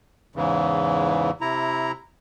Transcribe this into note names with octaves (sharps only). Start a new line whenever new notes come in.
E2 G#2 C#3 E3
C3 E4 A#5